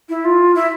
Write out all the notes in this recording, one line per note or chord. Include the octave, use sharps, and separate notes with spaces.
E4
F4
E4